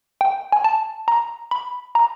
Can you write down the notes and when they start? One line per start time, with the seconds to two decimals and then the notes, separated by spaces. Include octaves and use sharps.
0.21 G5
0.52 G#5
0.64 A5
1.08 A#5
1.51 B5
1.95 A#5